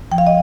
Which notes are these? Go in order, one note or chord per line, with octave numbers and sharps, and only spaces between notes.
F3 G5
F5
D#5